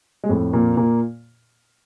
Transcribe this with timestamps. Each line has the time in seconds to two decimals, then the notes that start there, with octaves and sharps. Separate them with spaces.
0.24 G#3
0.29 F2 A2 A3
0.53 A#2 A#3
0.77 A#2 A#3